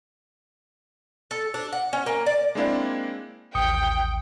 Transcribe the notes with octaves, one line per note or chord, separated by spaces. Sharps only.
A4
D4
F#5
C#4
A#3
D5
G#3 A#3 C4 D4 E4 F5
A1 D#2 G5 D#6 C#7